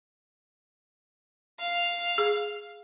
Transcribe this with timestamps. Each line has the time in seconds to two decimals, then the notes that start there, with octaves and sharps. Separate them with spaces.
1.60 F5
2.18 G#4